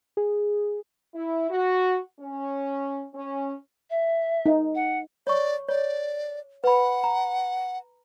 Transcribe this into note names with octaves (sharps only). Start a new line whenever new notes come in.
G#4
E4
F#4
C#4
C#4
E5
D#4
F#5
C#5 D5 C#6
C#5 D5
B4 F#5 B5
A#5